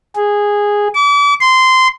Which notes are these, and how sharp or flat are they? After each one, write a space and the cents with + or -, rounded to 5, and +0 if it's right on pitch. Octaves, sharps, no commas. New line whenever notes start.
G#4 -10
D6 -40
C6 -15